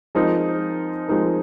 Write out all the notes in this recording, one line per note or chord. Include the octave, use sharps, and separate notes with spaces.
F3 G#3 C4 D#4 A#4
F3 G#3 C4 D#4 A#4